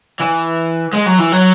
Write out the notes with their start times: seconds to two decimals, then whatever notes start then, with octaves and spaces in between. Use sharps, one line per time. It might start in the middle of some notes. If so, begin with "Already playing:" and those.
0.20 E3
0.93 G#3
1.06 F#3
1.19 E3
1.32 F#3